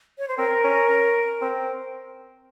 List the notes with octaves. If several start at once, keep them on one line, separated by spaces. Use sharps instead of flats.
C#5
C5
C4 A#4
C#4
C4